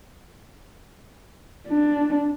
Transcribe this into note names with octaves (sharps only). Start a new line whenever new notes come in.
D4